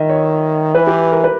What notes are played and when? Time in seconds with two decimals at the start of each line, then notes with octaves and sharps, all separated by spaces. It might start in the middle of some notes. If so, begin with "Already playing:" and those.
Already playing: D#3 D#5 E5
0.10 C#5
0.75 E3 B4
0.87 G4
1.12 A#4
1.24 B4